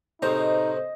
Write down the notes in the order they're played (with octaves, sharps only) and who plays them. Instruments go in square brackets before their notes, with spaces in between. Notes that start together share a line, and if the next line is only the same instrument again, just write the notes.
[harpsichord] C2 A2 A#5 [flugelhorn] D#4 [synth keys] C5 [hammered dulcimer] D#5